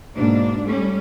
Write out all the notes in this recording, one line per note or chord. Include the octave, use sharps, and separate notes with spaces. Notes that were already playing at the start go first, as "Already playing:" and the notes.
G#2 B2 A#3 D4
G3 A3 C#4